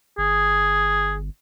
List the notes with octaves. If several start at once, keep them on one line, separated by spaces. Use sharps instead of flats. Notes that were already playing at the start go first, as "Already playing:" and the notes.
G1 G#4